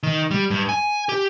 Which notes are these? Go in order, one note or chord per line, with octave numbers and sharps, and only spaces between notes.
D#3
G3
G2
G#5
G4